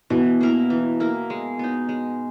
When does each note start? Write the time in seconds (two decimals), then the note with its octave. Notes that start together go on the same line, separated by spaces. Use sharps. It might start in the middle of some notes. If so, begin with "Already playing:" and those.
0.10 B2 E3
0.41 A#3 E4 A#4
0.70 E3
1.00 A#3 E4 A#4
1.30 G#3
1.59 B3 D#4
1.89 G#3